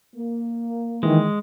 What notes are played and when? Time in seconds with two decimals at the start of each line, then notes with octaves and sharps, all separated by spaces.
0.16 A#3
1.03 D#3 E3 G#3